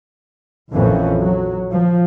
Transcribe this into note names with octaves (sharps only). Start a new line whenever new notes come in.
A#1 F2 A#2 E3 C#4
F#3
F3